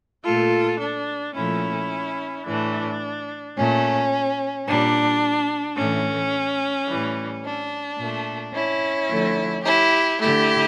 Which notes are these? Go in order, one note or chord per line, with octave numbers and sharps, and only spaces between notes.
A#2 A3 F4 A4
D4
A#2 F3 A3 C#4 E4
A2 E3 A3 D4
A#2 A3 C#4
A#2 G3 D4
A2 E3 A3 C#4
A2 E3 G3
D4
A#2 A3
C#4 E4
D3 F3 A3
E4 G4
D3 A3 E4 G4